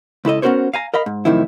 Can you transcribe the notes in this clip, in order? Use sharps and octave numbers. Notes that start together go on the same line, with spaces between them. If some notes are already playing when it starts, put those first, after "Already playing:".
C#2 E4 A4 D#5
B3 C#4 F#4 A#4 C5 C#5
F5 G#5 A#5
A#4 D#5 F5 B5
G#2
F#2 A2 C3 D#3 F3 E4